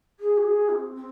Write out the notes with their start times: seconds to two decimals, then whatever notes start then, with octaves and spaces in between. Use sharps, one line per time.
0.19 G#4
0.37 F#4
0.44 G#4
0.69 C4
0.95 C4